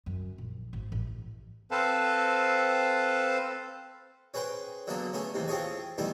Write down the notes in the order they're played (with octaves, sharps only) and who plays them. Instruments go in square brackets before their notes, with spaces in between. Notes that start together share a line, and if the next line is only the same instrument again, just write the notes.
[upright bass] F#2
A#1
G#1
A1
[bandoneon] C4 A4 B4 C5 F5 A5
[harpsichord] C#4 G#4 B4 C5 G5
D3 F#3 A#3 B3 G#4 A4
A3 B3 C#4 G#4
D#2 C3 E3
C4 F4 G#4 A4 C#5 G#5
D#3 E3 G3 A3 B3 E4